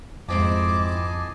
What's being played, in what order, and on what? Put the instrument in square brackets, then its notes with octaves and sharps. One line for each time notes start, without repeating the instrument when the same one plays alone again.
[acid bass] F2 [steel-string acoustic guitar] G#2 C4 E4 [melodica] D#5 G#5 A5 [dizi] D6